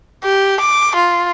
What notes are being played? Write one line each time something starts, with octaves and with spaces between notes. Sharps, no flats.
G4
D6
F4